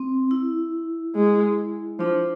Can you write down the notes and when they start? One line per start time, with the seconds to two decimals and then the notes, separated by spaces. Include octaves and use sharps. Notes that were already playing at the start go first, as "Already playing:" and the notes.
Already playing: C4
0.31 E4
1.16 G#3
2.00 F3 D4